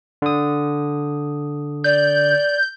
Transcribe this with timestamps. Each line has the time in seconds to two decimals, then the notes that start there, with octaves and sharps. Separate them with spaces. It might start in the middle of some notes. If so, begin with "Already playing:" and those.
0.22 D3 D#6
1.84 D5 G6